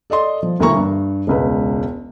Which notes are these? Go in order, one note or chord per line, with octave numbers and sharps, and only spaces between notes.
A4 D5 D#5 C6
F3
D#1 D2 E3 A#3 A#5 C#6
G2
E1 C#2 B4